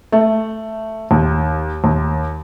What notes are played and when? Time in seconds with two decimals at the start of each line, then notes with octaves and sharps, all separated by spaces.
0.12 A3
1.11 D#2
1.84 D#2